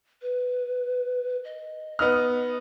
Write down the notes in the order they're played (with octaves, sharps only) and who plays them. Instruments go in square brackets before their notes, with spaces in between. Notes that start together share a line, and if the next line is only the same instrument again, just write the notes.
[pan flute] B4
D#5
[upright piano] B3 D#4 F6